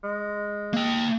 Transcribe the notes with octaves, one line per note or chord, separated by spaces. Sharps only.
G#3
A#3 G5